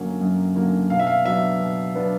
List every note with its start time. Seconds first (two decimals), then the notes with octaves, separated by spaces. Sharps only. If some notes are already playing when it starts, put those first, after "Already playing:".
Already playing: F#2 D3 F#3 A#3 C#4
0.21 F#2
0.55 D3 F#3 A#3 C#4
0.90 B2 F5
0.99 E5
1.07 F5
1.25 F#3 B3 D4 E5
1.60 B2
1.95 F#3 B3 D4